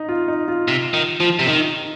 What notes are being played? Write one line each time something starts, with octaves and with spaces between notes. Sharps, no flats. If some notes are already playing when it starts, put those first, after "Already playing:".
Already playing: D#4
F4
D#4
F4
C3
D#3
F3
C3
D#3 D#4